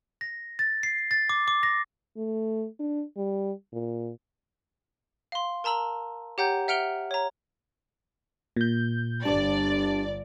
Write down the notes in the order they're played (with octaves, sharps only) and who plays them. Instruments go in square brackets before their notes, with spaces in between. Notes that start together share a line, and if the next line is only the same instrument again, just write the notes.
[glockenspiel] A#6
A6
C7
A6
D6
D6
A#6
[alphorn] A3
D4
G3
A#2
[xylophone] F5 C6
A#4 A5 A#5 E6 F#7
G4 C#5 F#5 G5 A#5 G6
E5 F#5 F6 D7 F7 G7
C#5 A#5
[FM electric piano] A#2 G6
[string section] G1 D5 [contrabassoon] G2 [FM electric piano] A5 D6